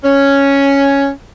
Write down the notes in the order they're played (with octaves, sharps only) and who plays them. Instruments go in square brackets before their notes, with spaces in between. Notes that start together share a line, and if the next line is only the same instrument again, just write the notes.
[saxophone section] C#4